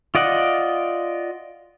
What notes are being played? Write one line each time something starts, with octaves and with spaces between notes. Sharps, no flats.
F4 D5 D#5 F#5